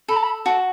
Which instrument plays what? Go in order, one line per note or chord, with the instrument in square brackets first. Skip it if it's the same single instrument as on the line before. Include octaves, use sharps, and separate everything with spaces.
[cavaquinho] A4 [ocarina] B5
[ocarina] A5
B5
[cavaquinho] F#4 [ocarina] A5